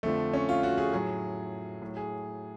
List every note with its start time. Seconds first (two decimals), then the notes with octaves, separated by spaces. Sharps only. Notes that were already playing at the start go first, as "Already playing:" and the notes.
0.03 F2 D3 F3 A3
0.33 C#4
0.49 F4
0.63 F#4
0.78 G#4
0.93 A2 F#3 G#4
1.82 A2 F#3
1.97 G#4